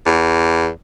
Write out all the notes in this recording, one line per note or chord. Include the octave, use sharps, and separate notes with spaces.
E2